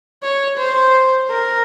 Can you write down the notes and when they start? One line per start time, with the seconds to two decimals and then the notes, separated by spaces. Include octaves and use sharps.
0.23 C#5
0.58 C5
1.30 A#4